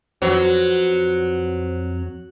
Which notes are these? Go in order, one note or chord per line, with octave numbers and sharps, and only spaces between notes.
F2 F#3 B4 C5